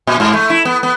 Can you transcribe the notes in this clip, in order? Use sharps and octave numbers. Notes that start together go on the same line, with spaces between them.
A#2
G#2
A3
E4
B3
B3